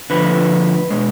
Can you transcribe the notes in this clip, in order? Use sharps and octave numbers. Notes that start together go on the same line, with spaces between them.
D3 F3 A3 B4
B2 G#3